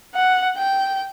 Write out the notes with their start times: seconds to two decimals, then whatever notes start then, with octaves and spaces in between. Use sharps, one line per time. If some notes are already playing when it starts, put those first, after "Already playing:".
0.15 F#5
0.57 G5